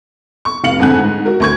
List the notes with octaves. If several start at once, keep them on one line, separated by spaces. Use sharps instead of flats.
C#6
F1 F5 C#7 F#7
F2 G#2 D3 F#5 G#5 F#6
G#2
F#4 A#4
D2 C#6 G#6